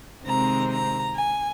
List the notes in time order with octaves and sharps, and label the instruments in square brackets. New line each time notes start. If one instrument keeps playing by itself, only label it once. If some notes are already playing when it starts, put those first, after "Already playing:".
[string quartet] C3 D#3 G#3 C4 A#5
A#5
G#5